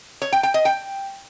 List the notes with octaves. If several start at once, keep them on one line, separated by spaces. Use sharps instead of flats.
C#5
G5
G5
D#5
G5